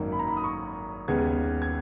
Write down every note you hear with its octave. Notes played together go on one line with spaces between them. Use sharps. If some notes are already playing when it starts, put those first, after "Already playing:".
Already playing: G#1 F#2 D#3 A#3
B5
A#5
B5
D#6
C#6
D#2 C#3 G#3 B3 G#6
G#6